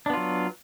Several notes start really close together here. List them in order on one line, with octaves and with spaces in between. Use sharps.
D4 B3 F4 F#3